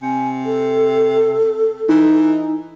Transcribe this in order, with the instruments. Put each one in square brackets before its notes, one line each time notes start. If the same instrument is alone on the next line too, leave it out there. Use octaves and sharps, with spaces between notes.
[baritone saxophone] C3 [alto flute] G#5
[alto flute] A4
[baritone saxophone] E3 [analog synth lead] D#4